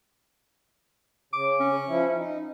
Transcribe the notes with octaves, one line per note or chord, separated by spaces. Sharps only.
C#3 D6
C#4
F3 E4
D#4